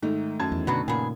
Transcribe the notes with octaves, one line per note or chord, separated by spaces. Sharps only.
G#2 D#3 A3 D#4
F#2 A5 G#6
E2
B2 D3 F#3 B3 F#4
A#2 C#3 B3 G#4